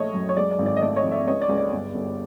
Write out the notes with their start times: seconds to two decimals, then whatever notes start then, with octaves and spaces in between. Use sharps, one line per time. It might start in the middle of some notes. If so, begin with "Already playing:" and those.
Already playing: A#1 A3 C#5 D#5
0.13 F#2
0.29 C#5
0.37 G#3 D5
0.51 D5
0.59 G#1
0.66 D5
0.77 D#5
0.81 A3 D5
0.96 C#5 D#5
1.04 F2
1.11 D5 E5
1.27 C#2 C#5 D#5
1.42 D5
1.49 C#2
1.58 D5
1.72 G1
1.94 G1